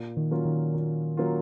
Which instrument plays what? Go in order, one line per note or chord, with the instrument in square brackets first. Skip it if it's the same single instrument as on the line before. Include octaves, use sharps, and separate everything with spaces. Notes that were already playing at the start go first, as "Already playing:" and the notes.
Already playing: [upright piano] A#2
[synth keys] D#3
[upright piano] F#3 A#3 C#4 F4
[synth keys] D#3
[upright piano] A#2
F#3 A#3 C#4 F4